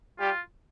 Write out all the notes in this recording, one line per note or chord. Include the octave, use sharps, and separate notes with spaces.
G3 F4 G4